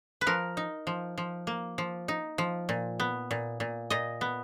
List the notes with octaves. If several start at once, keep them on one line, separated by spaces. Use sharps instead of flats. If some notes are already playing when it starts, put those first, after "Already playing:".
B4
F3 A#4
D#4
F3
F3
A#3
F3
D#4
F3
A#2
B3
A#2
A#2
A#2 D#5
B3